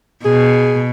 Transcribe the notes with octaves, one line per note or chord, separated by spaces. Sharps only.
B2 G#4